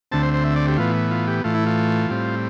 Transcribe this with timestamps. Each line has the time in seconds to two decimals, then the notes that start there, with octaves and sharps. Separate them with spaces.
0.12 D2 D3 A3 C4 A5
0.23 C5
0.34 C5
0.44 E5
0.56 D5
0.67 G4
0.77 A2 E3 B3 F4
1.11 F4
1.27 G4
1.44 A2 E3 A3 F4
1.54 E4
1.66 F4
2.10 A2 G3 C4